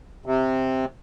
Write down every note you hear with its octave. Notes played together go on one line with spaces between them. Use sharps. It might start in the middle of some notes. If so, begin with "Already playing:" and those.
C3